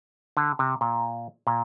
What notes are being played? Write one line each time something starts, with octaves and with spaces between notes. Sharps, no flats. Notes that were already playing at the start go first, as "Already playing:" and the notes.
D3
C3
A#2
A#2